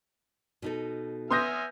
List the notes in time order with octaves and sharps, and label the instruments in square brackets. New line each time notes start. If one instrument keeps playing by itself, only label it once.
[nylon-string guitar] B2 D#4 A4
[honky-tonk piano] B3 A#6 [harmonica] E5 G#5 F6 [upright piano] C6 D#6 G6